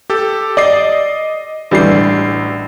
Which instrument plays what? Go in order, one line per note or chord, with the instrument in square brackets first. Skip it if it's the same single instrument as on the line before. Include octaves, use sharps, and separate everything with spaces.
[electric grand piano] G4 A4
[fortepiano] D5 [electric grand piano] D#5 D6 C7
[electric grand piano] A1 C7 [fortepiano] D3 E3 G3